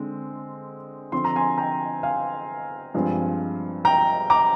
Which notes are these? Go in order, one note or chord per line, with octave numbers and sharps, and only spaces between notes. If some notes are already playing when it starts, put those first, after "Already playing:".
Already playing: D3 G#3 C4
D3 F3 C4 C6
A#5
G#5 C6
G5 A#5
F5 G#5
G2 F3 G#3 C4
G5 A#5
A#5 D6